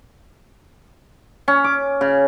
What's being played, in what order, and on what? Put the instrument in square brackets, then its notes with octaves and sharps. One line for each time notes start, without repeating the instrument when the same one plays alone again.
[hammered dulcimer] C#4
D6
C#3